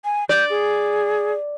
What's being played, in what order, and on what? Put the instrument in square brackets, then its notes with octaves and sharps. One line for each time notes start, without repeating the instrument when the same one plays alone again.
[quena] G#5
[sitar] D5 [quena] G6
[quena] G#4